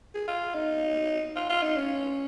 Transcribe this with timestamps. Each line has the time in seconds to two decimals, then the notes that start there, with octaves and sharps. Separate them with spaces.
0.15 G#4
0.28 F4
0.55 D#4
1.36 F4
1.50 F4
1.63 D#4
1.77 C#4